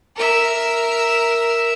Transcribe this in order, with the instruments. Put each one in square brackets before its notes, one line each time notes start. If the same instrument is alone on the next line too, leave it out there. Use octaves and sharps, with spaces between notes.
[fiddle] A#4 E5